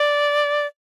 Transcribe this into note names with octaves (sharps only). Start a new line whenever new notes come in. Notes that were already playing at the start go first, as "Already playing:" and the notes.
Already playing: D5